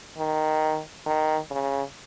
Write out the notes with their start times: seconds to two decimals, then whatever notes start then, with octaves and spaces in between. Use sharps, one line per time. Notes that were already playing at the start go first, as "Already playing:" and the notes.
0.18 D#3
1.06 D#3
1.51 C#3